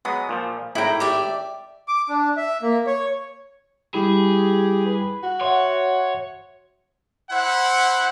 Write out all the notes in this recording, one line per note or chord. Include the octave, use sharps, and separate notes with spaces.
F#3 G#3 B3 D#6
A#2 F3
G#1 A2 E4 G5 A#5
G4 D5 E5
D6
D4
E5
A#3
C#5
G3 E4 G4 G#4 B5
B4
F#4
C#5 E5 F#5 C6
E4 C5 F#5